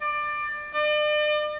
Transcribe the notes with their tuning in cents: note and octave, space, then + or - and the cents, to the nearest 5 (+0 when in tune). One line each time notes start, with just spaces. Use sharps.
D5 +20
D5 +40